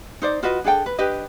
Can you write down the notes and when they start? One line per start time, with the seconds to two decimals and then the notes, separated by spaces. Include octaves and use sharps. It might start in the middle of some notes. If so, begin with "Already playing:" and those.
0.22 D#4 C5 D5
0.43 F4 F#4 B4 D#5
0.64 D4 G#4 A4 G5
0.86 B4
0.98 D4 G4 B4 D#5